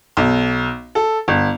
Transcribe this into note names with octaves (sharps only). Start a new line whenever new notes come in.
B1
A4
G1